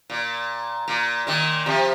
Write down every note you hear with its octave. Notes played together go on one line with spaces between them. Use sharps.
A#2
A#2
A#2 D#3
C3 F3